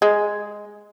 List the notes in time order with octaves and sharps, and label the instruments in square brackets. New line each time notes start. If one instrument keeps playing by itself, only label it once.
[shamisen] G#3